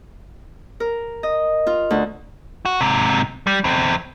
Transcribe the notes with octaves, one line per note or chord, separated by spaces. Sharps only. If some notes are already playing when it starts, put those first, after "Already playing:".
A#4
D#5
F4
D2
F#4
G#2 C3
G3
E2 C4